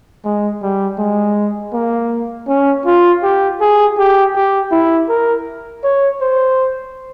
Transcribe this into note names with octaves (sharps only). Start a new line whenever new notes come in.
G#3
G3
G#3
A#3
C#4
F4
G4
G#4
G4
G4
E4
A#4
C#5
C5